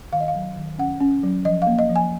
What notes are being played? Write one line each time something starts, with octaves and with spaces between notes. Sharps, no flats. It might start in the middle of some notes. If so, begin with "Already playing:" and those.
D#3 F5
D#5
F5
F#3
D#3
C#4 F#5
C#4
F#3
F3 D#5
A#3 F5
D#5
F3
G#5